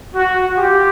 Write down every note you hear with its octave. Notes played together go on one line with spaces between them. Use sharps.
F#4
F4 G4